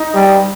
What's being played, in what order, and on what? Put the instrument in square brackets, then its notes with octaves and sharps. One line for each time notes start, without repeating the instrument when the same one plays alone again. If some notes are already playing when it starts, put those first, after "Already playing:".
Already playing: [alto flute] D#4
[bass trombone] G3